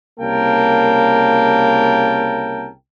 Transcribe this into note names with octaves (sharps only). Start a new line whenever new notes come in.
C2 C#3 A#3 A#4 G5 A5